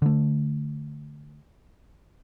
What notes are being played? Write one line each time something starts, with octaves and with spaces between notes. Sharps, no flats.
D3 A3